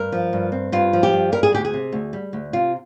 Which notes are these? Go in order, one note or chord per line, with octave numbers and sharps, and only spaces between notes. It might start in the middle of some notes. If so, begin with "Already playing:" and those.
Already playing: G2 A#4
F3
G2
C4
G2 F4
F3
G4
G2
G3 A#4
G#4
D2 G4
G#4
C3
D2
G3
D2
C3 F4